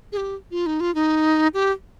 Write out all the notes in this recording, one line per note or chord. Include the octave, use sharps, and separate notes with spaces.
G#4
G4
F4
D#4
F4
D#4
G4